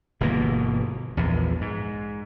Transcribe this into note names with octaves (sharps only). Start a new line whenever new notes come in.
G1 B2 E3 A#3
A#1 E2
G#2